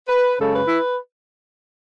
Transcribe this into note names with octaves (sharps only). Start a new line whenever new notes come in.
B4
F#2 C#3 G#3 A4
B4
E4